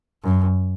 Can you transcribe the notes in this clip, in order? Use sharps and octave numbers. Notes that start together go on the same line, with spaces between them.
F#2